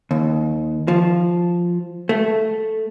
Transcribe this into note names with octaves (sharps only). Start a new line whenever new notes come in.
D#2
F3
A3